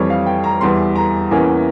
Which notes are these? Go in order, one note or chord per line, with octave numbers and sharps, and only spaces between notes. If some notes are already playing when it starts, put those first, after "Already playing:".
Already playing: F2 E3 G3 C#5
F5
G5
A#5
E2 E3 G3 C6
A#5
E2 E3 A#3 C#4 G#5